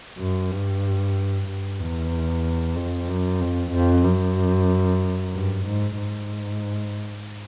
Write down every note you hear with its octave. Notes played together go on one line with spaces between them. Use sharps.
F#2
G2
G2
E2
F2
F#2
F2
F2
F#2
G2
G#2
G#2